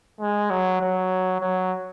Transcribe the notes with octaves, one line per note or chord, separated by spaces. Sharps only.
G#3
F#3
F#3
F#3